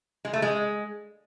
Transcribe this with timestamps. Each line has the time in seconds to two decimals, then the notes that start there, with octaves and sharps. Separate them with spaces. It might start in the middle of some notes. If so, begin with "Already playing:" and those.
0.25 G#3
0.33 A3
0.42 G#3